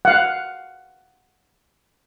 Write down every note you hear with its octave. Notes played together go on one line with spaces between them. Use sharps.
F5 F#5